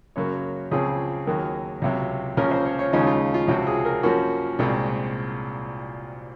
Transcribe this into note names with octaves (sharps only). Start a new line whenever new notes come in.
F#2 C#3 F#3 A#3 C#5
C#2 C#3 F3 C4 G#4
D#2 D#3 F#3 A#3
C#2 C3 F#3
C#2 C#3 F3 A#3 C#4 A#4
C5
C#5
C#5
D#2 C#3 F3 G#3 C#4 D#4
F4
F4
C#2 C3 F3 C4 F#4
G#4
A#4
F#2 F3 A#3 C#4 F#4
C2 A#2 G#3 C4